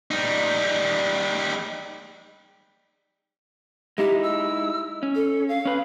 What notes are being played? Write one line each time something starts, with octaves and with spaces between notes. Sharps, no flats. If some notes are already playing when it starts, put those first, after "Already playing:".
G3 D#4
G#3 D#4 E4 G4
E6
C#4
A4
F5
C#4 B4